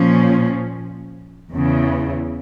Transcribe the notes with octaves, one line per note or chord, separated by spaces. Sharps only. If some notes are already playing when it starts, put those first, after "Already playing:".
Already playing: A#2 F3 C#4
E2 C#3 E3